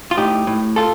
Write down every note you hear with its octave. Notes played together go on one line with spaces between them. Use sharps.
F4
A2 D#4 G4
A2
F4 A4